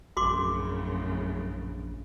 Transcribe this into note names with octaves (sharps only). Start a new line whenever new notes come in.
A#1 F#2 A2 C#3 F#4 C6 D6